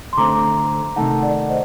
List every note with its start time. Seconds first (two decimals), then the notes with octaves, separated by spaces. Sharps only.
0.13 C6
0.17 D3 A3 C4 A#5 D6
0.96 C3 D#3 A3 D#4 F#5 A5
1.23 D5 F#5
1.49 C5 D#5